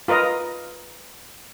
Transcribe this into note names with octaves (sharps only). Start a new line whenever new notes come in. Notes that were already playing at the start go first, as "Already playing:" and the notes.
F4 A#4 B4 D#5